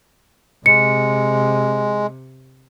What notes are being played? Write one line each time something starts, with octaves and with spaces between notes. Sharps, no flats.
C3 G#3 C#7